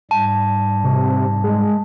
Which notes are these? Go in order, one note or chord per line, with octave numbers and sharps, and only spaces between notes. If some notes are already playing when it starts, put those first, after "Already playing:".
G#2 G3 A5
C3
G#3